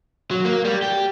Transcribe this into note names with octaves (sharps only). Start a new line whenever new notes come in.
F#3
A#3
G3
G4